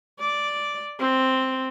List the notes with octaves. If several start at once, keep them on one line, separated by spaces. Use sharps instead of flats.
D5
C4